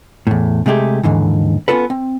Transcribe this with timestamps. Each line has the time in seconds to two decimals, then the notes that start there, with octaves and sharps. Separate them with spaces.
0.27 E2 A2
0.66 C3 G#3 A3 G4 G#4
1.03 D#2 G#2 D3 E3
1.68 B3 C#4 F4 A4 B4
1.90 C4